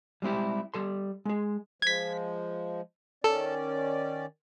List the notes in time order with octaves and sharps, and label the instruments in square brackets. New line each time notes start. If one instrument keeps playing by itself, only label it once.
[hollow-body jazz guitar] G3 G#3 C4 E4 G4
G3 A4 C6
G#3 G#4
[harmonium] F3 G#3 [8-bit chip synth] G#6 B6
[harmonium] D#3 C#4 D5 [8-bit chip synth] A4